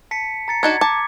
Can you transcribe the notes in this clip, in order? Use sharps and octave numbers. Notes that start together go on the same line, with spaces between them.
A5 B6 C#7
A#5 A6 C#7
D4 D#4 F#4 G#6
A5 D6